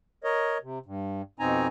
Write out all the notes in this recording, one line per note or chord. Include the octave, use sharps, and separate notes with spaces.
A#4 C#5 D#5
C3
G2
F2 B2 C4 D#4 G#5 A#5